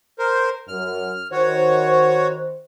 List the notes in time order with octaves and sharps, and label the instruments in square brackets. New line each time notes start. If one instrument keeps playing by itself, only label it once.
[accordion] A#4 C5
[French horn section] F#2 [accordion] F6
[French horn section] D#3 C5 [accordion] F#4 C#5